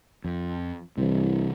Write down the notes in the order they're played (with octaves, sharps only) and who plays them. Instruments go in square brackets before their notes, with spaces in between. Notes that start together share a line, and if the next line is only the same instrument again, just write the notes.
[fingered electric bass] F2
[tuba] C2 [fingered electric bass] C3 E3